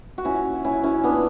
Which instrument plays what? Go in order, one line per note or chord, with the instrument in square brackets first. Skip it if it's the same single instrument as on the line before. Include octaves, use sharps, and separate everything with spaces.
[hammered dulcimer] F#4
A#2 C#4 E4
F#3
C#4 E4
F#3 C#4 E4
B3 D4
A#2